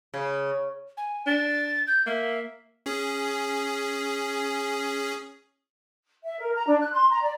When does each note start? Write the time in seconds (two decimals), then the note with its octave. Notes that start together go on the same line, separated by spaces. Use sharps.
0.14 C#3
0.97 G#5
1.27 D4 A6
1.87 G6
2.06 A#3 E5
2.86 C#4 G#4
6.24 E5
6.39 A#4
6.54 A#5
6.67 D4
6.79 F#6
6.94 C6
7.11 A#5
7.22 D5